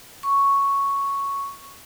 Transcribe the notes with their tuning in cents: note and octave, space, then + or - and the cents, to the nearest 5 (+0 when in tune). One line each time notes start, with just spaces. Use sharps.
C#6 +0